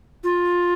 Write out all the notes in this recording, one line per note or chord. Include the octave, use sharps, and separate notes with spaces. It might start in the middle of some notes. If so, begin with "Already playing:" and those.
F4